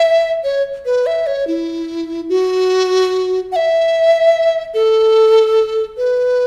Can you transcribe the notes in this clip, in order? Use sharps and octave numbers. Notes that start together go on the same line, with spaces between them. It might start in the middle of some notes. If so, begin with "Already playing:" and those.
Already playing: E5
C#5
B4
E5
C#5
E4
F#4
F#5
E5
A4
B4